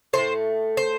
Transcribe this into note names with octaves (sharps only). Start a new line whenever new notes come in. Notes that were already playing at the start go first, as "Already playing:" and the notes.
A2 F#3 A3 C5
C5